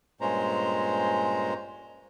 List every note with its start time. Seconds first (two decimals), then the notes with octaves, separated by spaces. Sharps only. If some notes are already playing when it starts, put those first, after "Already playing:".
0.21 G2 A#2 G#3 C#4 C5 A#5